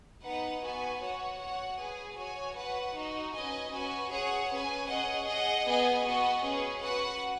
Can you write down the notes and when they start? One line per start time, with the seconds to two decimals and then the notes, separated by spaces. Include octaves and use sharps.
0.23 B3 D#4 B4 F#5
0.62 B3 F#4 B4 G#5
1.00 F#4 C#5 F#5
1.40 F#4 C#5 F#5
1.78 G#4 B4 G#5
2.17 F#4 C#5 G#5
2.56 F#4 B4 F#5
2.95 D#4 F#4 D#5
3.34 C#4 B4 D#5 G#5
3.72 C#4 F#4 B4 G#5
4.11 G#4 C#5 F#5
4.50 C#4 B4 G#5
4.88 C#4 G#4 D#5 F#5
5.27 G#4 D#5 F#5
5.66 B3 G#4 D#5 G#5
6.05 B3 F#4 B4 D#5
6.44 C#4 G#4 B4
6.82 F#4 B4 F#5